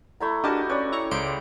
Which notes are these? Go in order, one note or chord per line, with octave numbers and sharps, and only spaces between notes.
A3 E4 A#5
D4 F#4 G4 A#4 D#5 A5
C#4 B4 C#5 D5
E4 A#5 C#6
C#2 C5 C6 D7